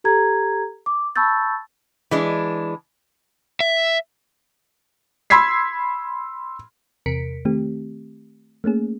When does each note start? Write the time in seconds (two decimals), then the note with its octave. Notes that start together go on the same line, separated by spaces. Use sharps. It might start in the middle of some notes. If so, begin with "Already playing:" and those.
0.04 G4 A4 A#5 G#6
0.86 D6
1.16 A5 B5 C#6 E6 G6 A6
2.11 E3 G#3 D4
3.60 E5
5.30 B5 C6 E6 G#6 B6 C7
7.06 E2 C3 A#4 B6 C#7 D7
7.45 D#3 A3 C4 G4
8.64 A3 A#3 C#4 G#4